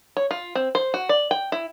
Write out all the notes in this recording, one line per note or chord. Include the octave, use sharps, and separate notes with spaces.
C#5
F4
C4
C5
F#4
D5
G5
E4